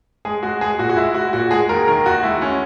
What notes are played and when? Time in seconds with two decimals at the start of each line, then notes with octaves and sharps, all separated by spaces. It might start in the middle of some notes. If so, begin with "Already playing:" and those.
0.25 G#3 G#4
0.43 G#3 F#4
0.61 G#3 G#4
0.78 A#2 F#4
0.89 F#4
0.96 G#3 E4
1.15 G#3 F#4
1.33 A#2 F#4
1.51 G#3 G#4
1.69 D#2 A#4
1.87 D#3 A#4
2.06 D#2 F#4
2.23 G#3 E4
2.41 G#3 C#4